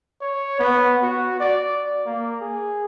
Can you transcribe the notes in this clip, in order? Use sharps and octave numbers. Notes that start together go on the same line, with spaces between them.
C#5
B3
F#4
D5
A#3
G#4